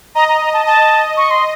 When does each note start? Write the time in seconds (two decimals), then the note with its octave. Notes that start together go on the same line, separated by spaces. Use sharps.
0.15 D#5 A#5
0.29 A#5
0.41 A#5
0.53 A5
0.66 D#5 A5
1.17 C#6
1.31 C6